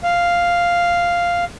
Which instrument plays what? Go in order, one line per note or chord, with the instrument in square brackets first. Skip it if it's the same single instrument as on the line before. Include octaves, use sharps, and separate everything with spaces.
[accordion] F5